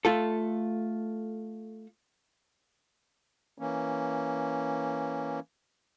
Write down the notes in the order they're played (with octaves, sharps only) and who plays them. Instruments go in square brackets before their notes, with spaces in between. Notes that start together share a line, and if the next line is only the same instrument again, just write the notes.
[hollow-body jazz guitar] A3 F4 A4
[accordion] E3 A#3 C#4